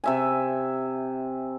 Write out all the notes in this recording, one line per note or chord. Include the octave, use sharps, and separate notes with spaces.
C3 E5 G#5